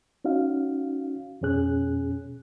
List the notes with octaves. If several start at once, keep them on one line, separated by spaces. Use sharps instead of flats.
C#4 D#4 F#4 F5
F2 B2 C#4 G#4 F#6